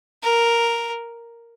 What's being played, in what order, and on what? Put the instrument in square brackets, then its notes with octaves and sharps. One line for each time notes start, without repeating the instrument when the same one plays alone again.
[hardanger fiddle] A#4